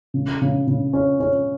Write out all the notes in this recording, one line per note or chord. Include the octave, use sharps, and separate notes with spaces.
C#3
C#3
C#3
C#4
C#4